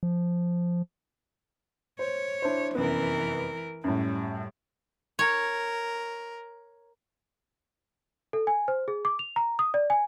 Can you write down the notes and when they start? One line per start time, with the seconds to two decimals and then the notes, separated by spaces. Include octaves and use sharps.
0.03 F3
1.99 C5 C#5
2.42 D4 E4 C5
2.75 F1 F#2 E3 B3 A#4
3.84 F#2 A2 G3
5.19 A#4 C#5
8.33 A4
8.47 G#5
8.68 C5
8.88 G#4
9.05 D6
9.19 F7
9.36 A#5
9.59 D#6
9.74 D5
9.90 G#5